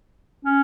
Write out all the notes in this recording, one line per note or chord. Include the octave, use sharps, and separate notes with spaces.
C#4